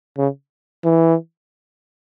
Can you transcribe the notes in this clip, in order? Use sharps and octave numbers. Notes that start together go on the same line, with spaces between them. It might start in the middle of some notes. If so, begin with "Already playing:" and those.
C#3
E3